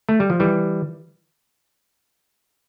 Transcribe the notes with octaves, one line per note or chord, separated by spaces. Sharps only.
A3
G3
F3
E3 G3